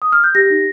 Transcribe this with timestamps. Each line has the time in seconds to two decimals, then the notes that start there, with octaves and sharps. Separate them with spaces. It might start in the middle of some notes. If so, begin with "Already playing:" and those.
0.02 D#6
0.12 F6
0.24 G6
0.35 G4 A#6
0.50 D#4